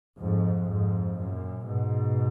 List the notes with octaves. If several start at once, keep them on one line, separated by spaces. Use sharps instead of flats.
F2 G#2
F2 G#2
F#2 A#2
G#2 B2